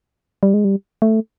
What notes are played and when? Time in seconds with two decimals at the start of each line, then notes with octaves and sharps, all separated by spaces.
0.43 G3
0.54 G#3
0.65 G3
1.02 A3